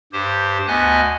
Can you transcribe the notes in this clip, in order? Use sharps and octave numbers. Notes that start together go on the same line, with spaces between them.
G2 G4 C5
D2 B3 D#5 G#5 F#6